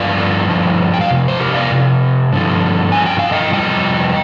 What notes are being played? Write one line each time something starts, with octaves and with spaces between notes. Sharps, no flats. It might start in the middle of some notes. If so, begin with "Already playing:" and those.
Already playing: G2 D3 F3 D5 F5
G2 D3 F3
G5
F5
F2 C3
C5
G4 A#4
D5 F5
F2 C3
G2 D3 F3
G2 D3 F3 G#5
G5
F5
D#5 G5
F2 C3 G3 D#5 G5